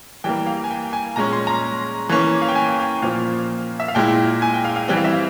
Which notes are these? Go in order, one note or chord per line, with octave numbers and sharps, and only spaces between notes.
E3 G3 A#3 G5
F5
G#5
G5
G#5
A#2 G#3 C#4 A#5
C6
A#5
E3 A#3 C#4
F5
G5
G#5
G5
A#2 F3 A#3 F4 F5
E5
F5
A#2 G#3 E4 G5
G#5
G5
F5
F5
E3 G3 C4 G5
F5
E5
F5